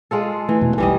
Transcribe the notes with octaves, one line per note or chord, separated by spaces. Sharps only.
G#3 F4 A4
E3 A3
E1 B2
B1 E3 G3 D#5